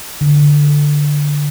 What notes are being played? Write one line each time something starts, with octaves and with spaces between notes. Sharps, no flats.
D3